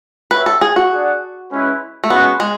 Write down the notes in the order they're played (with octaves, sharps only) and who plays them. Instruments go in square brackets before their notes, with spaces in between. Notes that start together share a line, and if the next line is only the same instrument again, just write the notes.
[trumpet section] F#4 C#5 E5 [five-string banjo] B4
[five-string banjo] A4
G#4
F#4
[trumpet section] D4 G#4 D5 F#5
G#3 C#4 E4 B4
[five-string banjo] A3
[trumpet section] G#3 C#4 F#4 [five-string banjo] B3
[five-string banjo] G#3